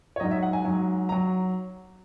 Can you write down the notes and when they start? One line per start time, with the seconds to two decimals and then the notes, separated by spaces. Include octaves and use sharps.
0.16 C#5
0.20 G#2 F#3 D#5
0.31 E5
0.43 F#5
0.53 G#5
0.65 G#2 F#3
1.09 A#5
1.12 F#3